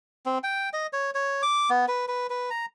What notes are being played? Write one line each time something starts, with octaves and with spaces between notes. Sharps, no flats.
C4
G5
D#5
C#5
C#5
D6
B3
B4
B4
B4
A#5